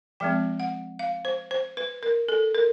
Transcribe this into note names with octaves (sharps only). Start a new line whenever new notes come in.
F3 G#3 C4 G5
F#5
F5
C5
C5
B4
A#4
A4
A#4